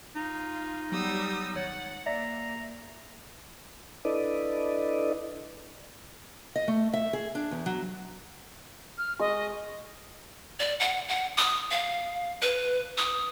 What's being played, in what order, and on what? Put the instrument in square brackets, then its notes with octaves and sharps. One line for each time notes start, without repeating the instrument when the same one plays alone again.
[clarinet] D#4 [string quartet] F4
[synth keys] F#3 B3 G4 [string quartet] G3 D#6 E6
[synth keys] G#1 C#5 A6 [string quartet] F#5
[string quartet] A#3 [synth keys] D5 E5 [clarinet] A#5
[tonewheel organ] D4 E4 A4 B4 D5 D#5
[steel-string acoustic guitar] D#5
A3
E5
G#4
D4
E2
F#3
[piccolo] F6
[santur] G#3 C#6 [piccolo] D#5
[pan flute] D5
F#5
F#5
D#6
F5
B4
D#6